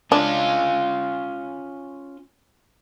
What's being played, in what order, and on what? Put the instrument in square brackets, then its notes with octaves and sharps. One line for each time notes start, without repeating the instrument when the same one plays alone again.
[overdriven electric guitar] C#4 F4 [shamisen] D4